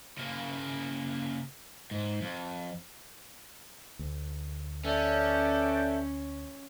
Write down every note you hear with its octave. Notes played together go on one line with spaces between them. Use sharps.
C#3 A#3
G#2
F2
D2
C#4 A4 B4 D5 E5 G5